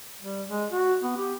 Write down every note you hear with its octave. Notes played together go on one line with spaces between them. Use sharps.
G3
G#3
F#4
B3
G4